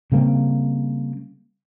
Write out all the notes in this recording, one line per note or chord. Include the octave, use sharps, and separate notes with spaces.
C#3 G3 A#3 C4